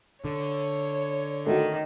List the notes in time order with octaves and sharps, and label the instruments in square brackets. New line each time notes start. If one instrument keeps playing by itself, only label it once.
[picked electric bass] D3 [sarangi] C#5
[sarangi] D#3 [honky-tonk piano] A3 F#4